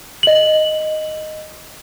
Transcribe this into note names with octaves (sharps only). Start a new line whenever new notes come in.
D#5 F#7